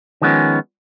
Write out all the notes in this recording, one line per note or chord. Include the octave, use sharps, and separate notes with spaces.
D#3 F3 G#3 B3 C#4